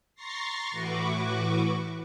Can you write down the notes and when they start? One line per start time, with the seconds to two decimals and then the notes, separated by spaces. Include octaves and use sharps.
0.15 A#5 C6 C#6 A6 A#6 C7
0.71 A2 E3 F#4 B4 C#6 D6